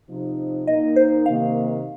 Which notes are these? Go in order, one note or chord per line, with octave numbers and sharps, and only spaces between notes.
C3 F3 C4 D#4
A#2 A#3 D#4 D#5
C5
C3 D#3 A#3 F5